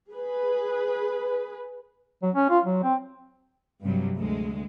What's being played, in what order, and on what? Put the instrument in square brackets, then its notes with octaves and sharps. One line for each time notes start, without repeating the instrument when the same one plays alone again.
[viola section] G#4 B4
[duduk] F#3
C#4
F4
F#3
C4
[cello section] G2 C3 F#3
D2 G#3